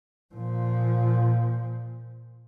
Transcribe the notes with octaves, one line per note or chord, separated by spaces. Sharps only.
A#2 F3